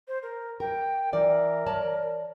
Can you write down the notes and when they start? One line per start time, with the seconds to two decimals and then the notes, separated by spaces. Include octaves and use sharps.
0.08 C5
0.23 A#4
0.60 A#4 G5
1.13 E3 A#4 D5
1.66 C#5 D5 A5